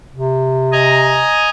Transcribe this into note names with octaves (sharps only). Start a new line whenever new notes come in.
C3
D#5 G#5 A#5